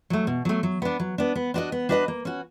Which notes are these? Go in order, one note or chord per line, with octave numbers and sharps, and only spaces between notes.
F#3 A3
B2
F#3 A3
F#3
B3 D4
F#3
B3 D4
B3
D4 F#4 B4 D#5
B3
D4 F#4 B4 D#5
A#3
C#4 F#4